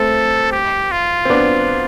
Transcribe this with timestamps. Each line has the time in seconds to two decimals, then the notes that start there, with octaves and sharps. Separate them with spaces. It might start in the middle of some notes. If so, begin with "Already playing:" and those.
Already playing: A3 C4 A4
0.52 G4
0.92 F4
1.25 C4
1.30 B3 D4